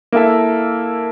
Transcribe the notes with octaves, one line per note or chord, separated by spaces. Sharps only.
A#3 E4 A4 E5